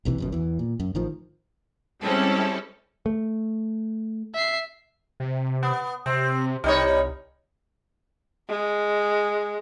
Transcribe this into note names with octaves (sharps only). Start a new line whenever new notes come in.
F#1 B1 C3 E3
G1 F#2 B2
E2 E3
A#2
F#2
A1 D#3 F3
G3 G#3 C4 C#4 E4 A4
A3
E5 C7
C3
B3
C3 C4
C2 G3 D#4 C#5
G#3